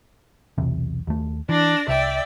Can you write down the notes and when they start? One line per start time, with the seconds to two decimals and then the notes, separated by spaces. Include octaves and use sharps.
0.58 B1 E2 C3
1.07 D#2 A3
1.49 E3 D4 D5 A#6
1.88 C2 D5 E5 G5